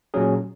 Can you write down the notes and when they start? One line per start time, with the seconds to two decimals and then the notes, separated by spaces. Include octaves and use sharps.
0.14 A#2 F#3 C#4 G#4